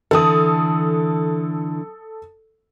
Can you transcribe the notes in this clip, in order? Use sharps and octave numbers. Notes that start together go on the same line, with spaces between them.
D3 E3 A4 D#6